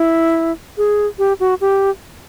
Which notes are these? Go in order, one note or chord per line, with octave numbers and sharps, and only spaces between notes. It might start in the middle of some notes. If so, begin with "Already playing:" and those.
Already playing: E4
G#4
G4
F#4
G4